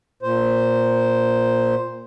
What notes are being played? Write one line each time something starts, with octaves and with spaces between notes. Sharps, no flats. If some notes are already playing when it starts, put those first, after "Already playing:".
A#2 C5